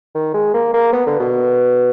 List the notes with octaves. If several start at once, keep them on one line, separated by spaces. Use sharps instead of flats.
D#3
G#3
A#3
A#3
B3
D3
B2